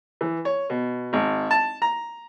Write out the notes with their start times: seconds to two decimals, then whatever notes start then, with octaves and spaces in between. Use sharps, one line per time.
0.21 E3
0.45 C#5
0.70 B2
1.13 G#1
1.51 A5
1.82 A#5